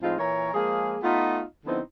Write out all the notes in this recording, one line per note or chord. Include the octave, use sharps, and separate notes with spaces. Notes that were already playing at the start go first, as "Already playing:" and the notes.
A2 F3 G#3 C4 D#4 F4
A#2 E3 A#4 C#5
F3 G#3 A#3 G#4
A3 B3 D#4 F4
D3 F3 B3 C4 D#4 E4